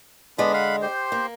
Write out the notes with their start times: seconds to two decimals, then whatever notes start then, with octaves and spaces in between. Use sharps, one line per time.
0.38 D3 G#3 B3 D4 B5
0.53 F5 F#5 B5
0.82 G4 C5 C6
1.12 A#3